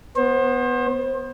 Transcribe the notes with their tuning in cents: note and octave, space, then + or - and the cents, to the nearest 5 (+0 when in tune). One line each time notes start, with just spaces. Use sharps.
B3 +0 C5 +30